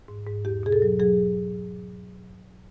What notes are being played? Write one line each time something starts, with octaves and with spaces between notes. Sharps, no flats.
G#2
G#2
E2 G4
B2 G#4
A4
F#3
F#3 G#4